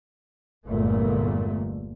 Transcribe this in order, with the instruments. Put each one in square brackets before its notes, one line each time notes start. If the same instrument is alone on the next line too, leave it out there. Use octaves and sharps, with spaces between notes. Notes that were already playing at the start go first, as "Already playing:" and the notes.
[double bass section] G1 E2 A#2 D3 G#3 A3